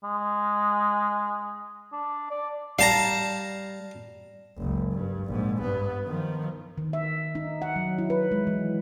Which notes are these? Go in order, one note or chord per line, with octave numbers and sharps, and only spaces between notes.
G#3
D4
D5
G3 F5 A5 A#5
F#1 C#2
G2
A#1 G#2
G2 B3
D#3 F3
D#3
E5
D#4
F#5
F#3
E4
B4
G#3
E3